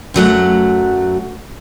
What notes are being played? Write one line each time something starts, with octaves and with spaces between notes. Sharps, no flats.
F#2 F#3 A3 F#5